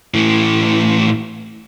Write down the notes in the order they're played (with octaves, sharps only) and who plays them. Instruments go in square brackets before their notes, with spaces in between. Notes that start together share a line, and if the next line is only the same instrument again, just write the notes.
[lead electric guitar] A2 E3